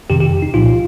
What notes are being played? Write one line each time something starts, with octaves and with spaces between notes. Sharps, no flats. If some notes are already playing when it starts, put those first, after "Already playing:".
F2 C3 D#3 G4
G4
D#4
C2 A#2 F3 F4